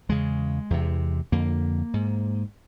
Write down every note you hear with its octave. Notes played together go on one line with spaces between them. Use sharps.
E2 C#3 G#3
E2 C3
F2 D3 A#3
G#2